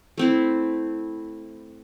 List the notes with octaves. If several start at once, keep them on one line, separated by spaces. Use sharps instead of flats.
A3 C4 E4